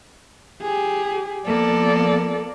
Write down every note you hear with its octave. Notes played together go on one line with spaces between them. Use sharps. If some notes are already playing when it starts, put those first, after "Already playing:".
G4 G#4
F3 A#3 B3 A4 D5